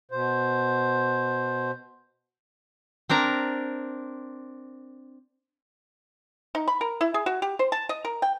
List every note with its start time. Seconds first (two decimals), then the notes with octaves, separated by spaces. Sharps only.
0.12 B2 C5
3.09 C4 D4 A#4 A#5
6.55 D#4
6.68 B5
6.81 A#4
7.01 E4
7.14 G#4
7.26 F#4
7.42 G4
7.59 C5
7.72 A5
7.89 D#5
8.05 A#4
8.22 G5